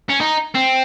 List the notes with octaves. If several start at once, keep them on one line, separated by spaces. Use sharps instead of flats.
C#4
D#4
C4